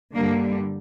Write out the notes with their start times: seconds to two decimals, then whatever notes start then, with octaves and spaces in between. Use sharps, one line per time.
0.16 G2 D3 G3 A#3